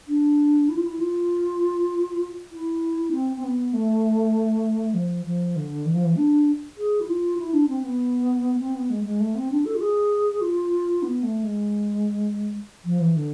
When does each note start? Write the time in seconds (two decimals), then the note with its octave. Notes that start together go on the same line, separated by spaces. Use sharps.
0.08 D4
0.69 E4
0.76 F4
0.85 E4
0.99 F4
2.52 E4
3.12 C4
3.36 C4
3.43 B3
3.73 A3
4.94 F3
5.25 F3
5.56 D3
5.85 E3
5.94 F3
6.05 E3
6.16 D4
6.77 G#4
7.01 E4
7.08 F4
7.38 E4
7.53 D4
7.68 C4
7.83 B3
8.59 C4
8.74 B3
8.90 G#3
9.04 G#3
9.20 A3
9.35 C4
9.51 D4
9.65 A4
9.75 F4
9.81 G#4
10.41 F4
11.03 B3
11.23 A3
11.44 G#3
12.85 F3
13.00 E3
13.16 D3